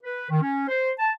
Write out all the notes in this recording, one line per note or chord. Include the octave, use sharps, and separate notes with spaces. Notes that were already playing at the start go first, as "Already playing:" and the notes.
B4
D#3
C#4
C5
A5